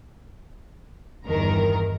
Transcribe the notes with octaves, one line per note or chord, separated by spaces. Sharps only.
G1 E2 D#3 A#4 A#5